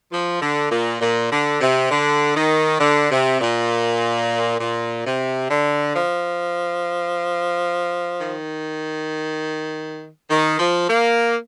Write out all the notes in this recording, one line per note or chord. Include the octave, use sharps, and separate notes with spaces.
F3
D3
A#2
A#2
D3
C3
D3
D#3
D3
C3
A#2
A#2
C3
D3
F3
D#3
D#3
F3
A#3